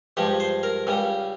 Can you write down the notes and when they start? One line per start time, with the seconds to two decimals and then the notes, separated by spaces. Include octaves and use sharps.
0.17 G2 F3 G#3 G4
0.40 C5
0.63 A#4
0.87 C#2 C#3 G3